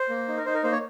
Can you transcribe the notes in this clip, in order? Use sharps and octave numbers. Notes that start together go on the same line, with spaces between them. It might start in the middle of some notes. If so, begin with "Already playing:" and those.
Already playing: C5
A#3
D#4
A#4
D#4 C5
A#4
A#3 C5
C#5